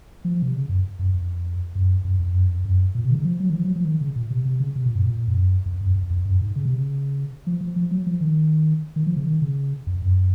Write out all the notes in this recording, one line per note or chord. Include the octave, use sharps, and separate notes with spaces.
F3
C3
C#3
F#2
F#2
F2
F#2
F#2
F2
F#2
F2
F#2
A#2
C3
D#3
C#3
F3
F#3
D#3
F3
F#3
F3
D#3
C#3
A#2
C3
C3
C#3
C3
A#2
F#2
A#2
F2
F#2
F2
F#2
F2
F2
F#2
G#2
C#3
C3
C#3
F3
F3
F3
F#3
F3
D#3
D#3
F3
C#3
D#3
C#3
F2
F#2